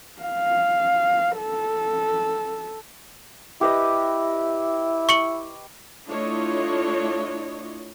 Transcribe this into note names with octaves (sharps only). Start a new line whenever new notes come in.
F5
A4
E4 G4 B4 D#5
C#6 C#7 F#7
A3 D4 E4 F4 C#5 D#5